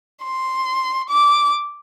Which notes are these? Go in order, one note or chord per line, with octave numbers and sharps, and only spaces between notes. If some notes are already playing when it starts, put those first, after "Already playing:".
C6
D6